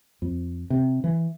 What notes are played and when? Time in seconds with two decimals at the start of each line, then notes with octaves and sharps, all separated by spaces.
0.22 F2
0.70 C3
1.04 E3